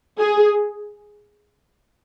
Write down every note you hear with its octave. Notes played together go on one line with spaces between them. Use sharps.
G#4